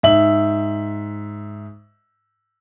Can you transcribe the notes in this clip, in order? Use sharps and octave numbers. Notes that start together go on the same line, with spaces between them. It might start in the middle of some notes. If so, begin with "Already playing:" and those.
G#2 E5 F#7